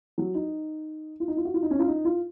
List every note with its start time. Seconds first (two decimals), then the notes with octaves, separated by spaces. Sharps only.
0.18 F#3
0.35 D#4
1.20 F4
1.28 D#4
1.37 F4
1.45 F#4
1.54 F4
1.63 D#4
1.71 C#4
1.79 F4
1.88 D#4
2.05 F4